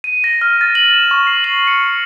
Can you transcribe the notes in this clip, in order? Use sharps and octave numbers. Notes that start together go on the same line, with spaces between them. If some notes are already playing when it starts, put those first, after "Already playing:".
D#7
A#6
F6
A6
F#7
E7
C#6
C7
F#7
C#7